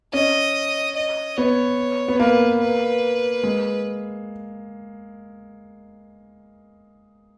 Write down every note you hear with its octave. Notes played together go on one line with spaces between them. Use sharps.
C#4 D#5
D#5
B3 C#5
B3
A#3 B4
B4
G#3